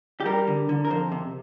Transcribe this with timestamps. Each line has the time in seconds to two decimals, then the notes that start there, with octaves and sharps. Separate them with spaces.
0.20 G4
0.26 G3 A#4
0.47 D3
0.69 D3
0.85 A#4
0.90 F2 C5
1.12 C3